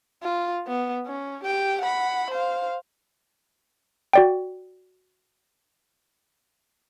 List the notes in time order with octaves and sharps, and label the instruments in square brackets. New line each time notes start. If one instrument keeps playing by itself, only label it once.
[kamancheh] F4
B3
C#4
G4 G5
F#5 B5
C5 F5
[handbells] F#4 D5 G5